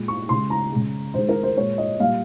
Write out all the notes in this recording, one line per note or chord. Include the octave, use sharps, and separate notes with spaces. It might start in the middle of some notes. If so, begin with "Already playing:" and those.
Already playing: A#2 G#3
C#6
C#3 G#3 C6
A#5
C#3 G#3
D#3 G#3 C5
A#4
C5
A#2 G#3 C#5
D#5
A#2 G3 A#3 F5